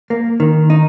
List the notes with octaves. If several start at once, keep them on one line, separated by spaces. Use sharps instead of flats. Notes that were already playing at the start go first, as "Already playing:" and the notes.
A#3
D#3
D#4